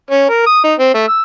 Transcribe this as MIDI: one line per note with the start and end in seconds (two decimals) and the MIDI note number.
0.10 0.26 61
0.29 0.42 70
0.46 0.62 87
0.64 0.74 63
0.79 0.90 60
0.94 1.04 57
1.08 1.22 88